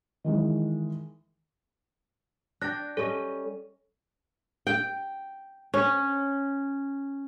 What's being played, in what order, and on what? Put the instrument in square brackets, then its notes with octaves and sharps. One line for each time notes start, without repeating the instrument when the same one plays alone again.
[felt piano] D#3 E3 G#3
[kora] D4 G5 [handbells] F#6 A#6
[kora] G3 C#4 D#5 [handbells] A4
[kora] G5
C#4